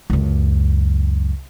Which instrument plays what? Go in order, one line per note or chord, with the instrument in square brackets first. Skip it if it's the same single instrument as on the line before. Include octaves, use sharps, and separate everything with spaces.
[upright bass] C#2 F#2